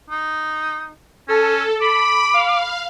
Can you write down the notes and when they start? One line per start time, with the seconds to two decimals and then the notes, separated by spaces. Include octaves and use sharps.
0.10 D#4
1.28 C#4 A4
1.81 B5 D6
2.34 F5